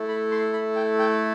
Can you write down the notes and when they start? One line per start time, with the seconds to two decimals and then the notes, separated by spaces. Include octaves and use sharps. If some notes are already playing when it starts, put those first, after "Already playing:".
Already playing: A3 E4 A4
0.09 B5
0.32 C6
0.53 B5
0.76 G5
0.99 G5